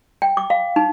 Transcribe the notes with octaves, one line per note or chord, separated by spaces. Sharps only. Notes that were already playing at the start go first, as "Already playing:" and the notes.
G5
D6
F5
D#4